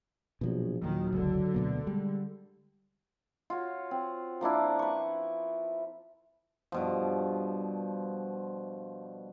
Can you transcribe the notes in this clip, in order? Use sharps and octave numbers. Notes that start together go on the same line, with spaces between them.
A#1 B2 F3 F#3
D#2 A#2 D#3 F#3
F#1 C#2 D3
D2 B2 A#3
G3 G#3
F4 F#4 C#5
C4
F3 A#3 D4 E4
B4 C#6
G2 B2 F3